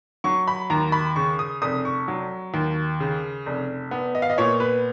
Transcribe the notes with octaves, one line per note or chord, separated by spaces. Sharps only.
F#3 C#6
B5
D#2 A#5
B5
C#3 C#6
D#6
F1 D#6
C#6
F#3
D#2
C#3
F1
B3
D#5
F5
D#5
A#2 C#5
B4